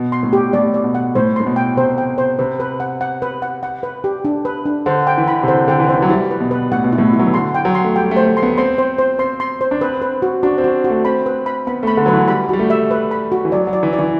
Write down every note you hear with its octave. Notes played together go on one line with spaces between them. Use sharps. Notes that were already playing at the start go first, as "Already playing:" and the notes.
Already playing: B2
C6
A2
G4
A2 D5
D5
B2
F#5
A2 C5
A2 C6
B2
G5
C3 C5
G5
C5
C3 B4
B4
F#5
F#5
B4
F#5
F#5
B4
G4
D4
B4
D4
D3 C5
G5
E3
B5
C3
D3 C5
D3 G5
E3
C5
E3
F#3
G3 E4
B4
B2
B4
A2 F#5
B2
E4
A2
E4
F#3
E3
D3 C6
G5
F#3
C6
A3
G3 G5
A3
C5
A3
C6
B3
C4 C6
C5
C5
C4 C6
C6
C5
D4
C4 B4
B4
F#4
D4 F#4
C4
F#4
F#4
A3
C4 B5
B4
B5
B3 B5
A3 B5
D3
F#3 B4
E3
G3 B5
G3 F#4
A3
E5
B4
B5
F#4
E3
F#3 D5
F#3
D5
E3
D5
E3